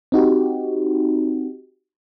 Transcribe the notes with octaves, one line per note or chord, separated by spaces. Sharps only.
C4 D#4 F#4 G4